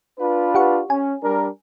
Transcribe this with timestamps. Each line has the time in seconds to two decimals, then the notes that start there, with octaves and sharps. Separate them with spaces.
0.19 D4 F4 B4
0.55 G4 F#5 C#6
0.90 C#4 G#5
1.24 G3 D4 A#4